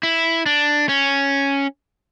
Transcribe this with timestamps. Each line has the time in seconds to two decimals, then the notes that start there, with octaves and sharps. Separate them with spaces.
0.03 E4
0.46 D4
0.89 C#4